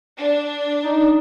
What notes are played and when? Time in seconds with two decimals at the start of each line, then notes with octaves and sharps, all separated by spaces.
0.18 D4
0.84 D#4